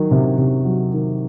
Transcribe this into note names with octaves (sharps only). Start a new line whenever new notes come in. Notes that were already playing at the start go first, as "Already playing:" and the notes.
Already playing: D#3 F#3
C3
C3
F#3
D#3